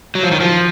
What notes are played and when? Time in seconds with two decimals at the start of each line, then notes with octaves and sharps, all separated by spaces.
0.15 F#3
0.23 F3
0.32 D#3
0.40 F3